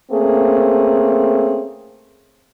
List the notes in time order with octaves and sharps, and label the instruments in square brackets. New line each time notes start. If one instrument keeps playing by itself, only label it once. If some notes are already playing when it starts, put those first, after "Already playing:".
[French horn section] A3 A#3 C4 C#4 G#4